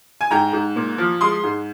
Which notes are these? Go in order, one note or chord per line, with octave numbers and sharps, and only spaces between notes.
G#5
G#2 G5 A#5
G#2
A#2
F3
G#3 C6 D#6
G#2